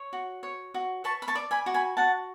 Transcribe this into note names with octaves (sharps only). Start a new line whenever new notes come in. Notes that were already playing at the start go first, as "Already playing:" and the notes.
Already playing: C#5
F#4
C#5
F#4
B4 A5 C#6
B5
A5 C#6
D5
G#5 B5
F#4
G#5 B5
F#4 F#5 A5